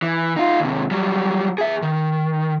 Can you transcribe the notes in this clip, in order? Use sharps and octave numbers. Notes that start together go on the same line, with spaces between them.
E3
D#4 F4
D#2 C3
F#3 G3
G#4 E5
D#3